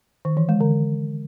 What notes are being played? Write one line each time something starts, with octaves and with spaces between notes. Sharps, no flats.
D#3
E3
G#3
D3